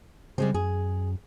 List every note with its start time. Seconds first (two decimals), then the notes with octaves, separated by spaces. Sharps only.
0.38 C#3 G3 G#3 C4
0.54 F#2 G#4